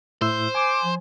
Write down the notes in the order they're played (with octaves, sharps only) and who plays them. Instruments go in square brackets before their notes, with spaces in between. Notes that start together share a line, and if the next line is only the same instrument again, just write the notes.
[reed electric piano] A2 E4 E6 [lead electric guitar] C5
[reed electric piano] G#5 [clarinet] D6
[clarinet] F3